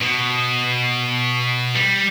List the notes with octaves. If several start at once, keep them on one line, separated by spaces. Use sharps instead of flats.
B2
G3